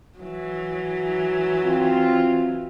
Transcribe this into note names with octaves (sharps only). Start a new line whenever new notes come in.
E3 F#3
C4 F4